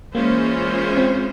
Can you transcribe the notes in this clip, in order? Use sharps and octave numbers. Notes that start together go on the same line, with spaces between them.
E3 G#3 A#3 C#4 F4 C5
C4